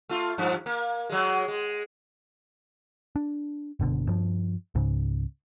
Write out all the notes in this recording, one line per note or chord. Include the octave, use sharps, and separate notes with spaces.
A3 F4
G2 F3
A#3
F#3 G#3
G#3
D4
F#1 B2 D3
G2 F3
C#2 G#2 C#3